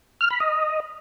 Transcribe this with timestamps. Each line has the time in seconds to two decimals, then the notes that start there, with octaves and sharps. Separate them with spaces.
0.21 F6
0.30 B5
0.40 D#5